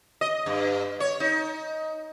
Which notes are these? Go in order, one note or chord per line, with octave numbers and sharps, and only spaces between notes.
D#5
G2
C#5
D#4